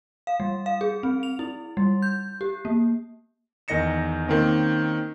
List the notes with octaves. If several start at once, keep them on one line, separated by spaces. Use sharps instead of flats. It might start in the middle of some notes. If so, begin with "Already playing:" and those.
F5
G3
F5
G#4
C4
F7
E4
G3
G6
G4
A#3
E2 D#3 D#5 A#6 C#7 E7
D#3 A#3 C4 C#4 D#4